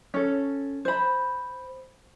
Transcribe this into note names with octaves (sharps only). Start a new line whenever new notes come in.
C#4 A4
C5 B5